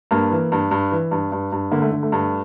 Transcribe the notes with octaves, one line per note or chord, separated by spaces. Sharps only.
G2 A#3
E3
G2
G2
E3
G2
G2
G2
D3 A#3
A3
D3
A3
G2